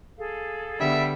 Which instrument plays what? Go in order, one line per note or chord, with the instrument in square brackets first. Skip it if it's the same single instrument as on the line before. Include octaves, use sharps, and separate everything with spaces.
[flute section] G#4 A4 F5
[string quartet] D3 G3 B3 [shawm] E5